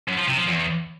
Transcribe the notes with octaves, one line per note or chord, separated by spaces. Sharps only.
F#2
F3
C3
F3
E2